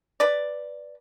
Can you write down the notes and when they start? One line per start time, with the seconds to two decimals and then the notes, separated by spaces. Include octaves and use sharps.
0.20 B4 D5